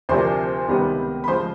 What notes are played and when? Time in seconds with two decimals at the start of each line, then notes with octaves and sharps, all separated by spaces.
0.09 D2 C3 F3 A#3 D4 C5 C6
0.68 C#2 C3 D#3 G3 B3
1.24 B5
1.27 C#3 F3 G#3 C5 C6